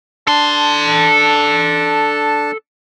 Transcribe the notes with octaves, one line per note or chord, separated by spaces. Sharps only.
D4 A4 A5 C6